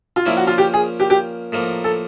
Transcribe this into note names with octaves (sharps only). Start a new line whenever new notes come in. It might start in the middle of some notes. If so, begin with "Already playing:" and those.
F4
A#2 F3 A#3 C#4 E4
F#4
F4
G4
G#4
G4
G4
A2 F3 A#3 D#4
A4